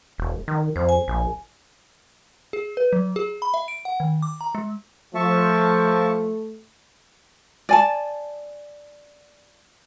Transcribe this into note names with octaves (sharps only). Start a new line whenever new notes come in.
E1
D#3
F2 C5
G#5
A#1
G#4
B4
F#3
G#4
B5
E5
D7
F#5
D#3
D6
A#5
G#3
F3 A3 E5 A5 C#6
D5 G#5 A5